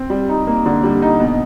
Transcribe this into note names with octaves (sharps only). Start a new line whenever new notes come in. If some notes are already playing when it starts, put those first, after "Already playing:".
Already playing: C4
G3
D#4
A#3
D3
G3
D#4
B2